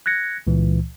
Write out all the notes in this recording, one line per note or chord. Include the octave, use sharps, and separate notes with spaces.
F#6 G#6 A#6 C#7
C#2 A#2 E3